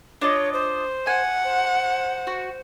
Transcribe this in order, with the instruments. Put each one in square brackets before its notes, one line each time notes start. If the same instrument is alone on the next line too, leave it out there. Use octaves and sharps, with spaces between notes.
[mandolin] D4 F4 D#5 [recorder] C#5
[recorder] C5
[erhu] F#5 [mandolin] G#5
[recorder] C5
[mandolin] F#4